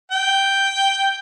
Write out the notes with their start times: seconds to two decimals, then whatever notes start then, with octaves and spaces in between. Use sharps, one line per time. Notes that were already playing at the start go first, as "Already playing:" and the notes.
0.12 G5